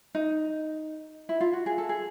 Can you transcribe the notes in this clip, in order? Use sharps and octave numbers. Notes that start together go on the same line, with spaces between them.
D#4
E4
F4
F#4
G#4
A4
G#4